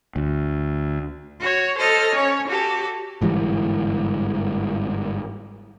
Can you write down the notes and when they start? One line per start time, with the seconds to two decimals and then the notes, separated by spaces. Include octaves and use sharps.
0.16 D2
1.39 F#4 C#5
1.77 A4 C5 D#5 F6
2.11 C#4 C#5
2.47 F#4 G4 A4
3.21 G1 G#2 E3 G3